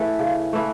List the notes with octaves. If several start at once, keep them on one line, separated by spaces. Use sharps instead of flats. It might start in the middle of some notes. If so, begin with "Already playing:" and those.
Already playing: E3 A3 G#4
C#3
E3 A3